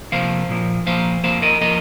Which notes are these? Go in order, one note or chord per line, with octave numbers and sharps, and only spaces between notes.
C3 F3 A#3 C5 F5
A#2 F3 A#3
A#2 F3 A#3 C5 F5
F2 F3 A#3 C5 F5
A#4 D#5
F3 A#3 A#4 D#5